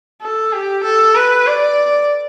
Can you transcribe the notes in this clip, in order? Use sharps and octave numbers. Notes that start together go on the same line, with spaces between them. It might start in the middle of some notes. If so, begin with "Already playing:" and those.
A4
G4
A4
B4
D5